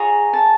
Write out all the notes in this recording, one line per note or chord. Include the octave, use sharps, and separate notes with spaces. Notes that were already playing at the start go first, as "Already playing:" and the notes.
Already playing: F4 G#4 C#5 A#5
A5